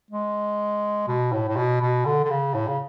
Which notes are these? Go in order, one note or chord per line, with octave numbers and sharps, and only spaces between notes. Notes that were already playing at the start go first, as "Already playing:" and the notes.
G#3
B2
A2
A2
B2
B2
D3
D3
C#3
A2
C#3